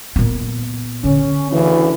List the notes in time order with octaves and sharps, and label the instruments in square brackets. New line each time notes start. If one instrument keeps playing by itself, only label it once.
[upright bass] A#2 B3
[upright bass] D3 [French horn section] C#4
[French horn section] D2 C#3 E3